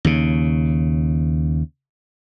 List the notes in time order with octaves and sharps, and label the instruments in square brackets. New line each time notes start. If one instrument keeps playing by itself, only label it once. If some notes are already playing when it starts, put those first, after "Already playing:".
[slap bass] D#2 C#3